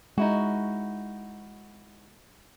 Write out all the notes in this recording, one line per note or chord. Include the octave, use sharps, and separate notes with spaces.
G#3 D#4 E4 F#4